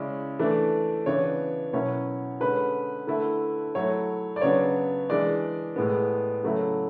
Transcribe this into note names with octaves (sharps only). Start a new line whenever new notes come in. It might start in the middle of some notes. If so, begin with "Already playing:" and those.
Already playing: C#3 G#3 C#4 E4 D5
E3 A3 D4
C#3 E3 B3 D4 C#5
B2 F#3 C#4 E4 C#5
D3 G#3 C#4 B4
D3 A3 E4
F#3 A3 E4 C#5
D5
C#3 F#3 B3 D4 C#5
E3 G#3 D4 D5
A2 G#3 B3
C#3 F#3 A3 E4